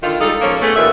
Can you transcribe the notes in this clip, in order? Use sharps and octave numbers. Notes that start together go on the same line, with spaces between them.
D3 D#3 F4
G3 G#3 D#4 F4 A4
F3 A#3 C#4 A4
A3 B3 C#4 G#4 A4
D#2 A#2 D#3 B4 E5